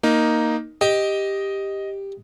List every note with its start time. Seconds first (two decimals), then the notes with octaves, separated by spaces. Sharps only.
0.03 A#3 D#4
0.81 G4 D#5